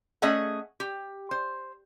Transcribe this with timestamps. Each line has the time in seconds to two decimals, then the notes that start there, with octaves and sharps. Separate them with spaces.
0.22 A3 C#4 G#4 D#5 E5 F#5
0.80 G4
1.31 C5